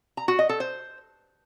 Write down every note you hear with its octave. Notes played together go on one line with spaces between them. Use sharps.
A#5
F#4
D#5
A4
C5